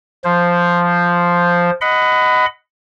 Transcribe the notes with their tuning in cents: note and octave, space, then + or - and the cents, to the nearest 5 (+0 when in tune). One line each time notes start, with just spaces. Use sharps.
F3 +0 C5 +0
D#5 +0 F#5 +0 B5 +25